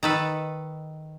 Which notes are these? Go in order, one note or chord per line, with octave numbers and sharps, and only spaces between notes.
D#3 A4 B4